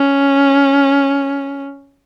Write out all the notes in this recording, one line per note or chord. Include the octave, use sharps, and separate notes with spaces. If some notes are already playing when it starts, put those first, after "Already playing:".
Already playing: C#4